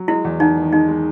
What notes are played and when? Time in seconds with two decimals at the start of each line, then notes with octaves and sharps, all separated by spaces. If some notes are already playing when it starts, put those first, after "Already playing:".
Already playing: F#3
0.08 G#3 E4
0.25 E2
0.40 E2 D#4
0.56 D#3
0.73 G#3 D#4
0.88 G#3